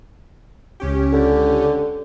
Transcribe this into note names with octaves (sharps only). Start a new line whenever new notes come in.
C#2 C#4 G4
D3